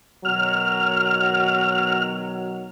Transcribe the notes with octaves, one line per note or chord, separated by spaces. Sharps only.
B2 D#3 F#3 F6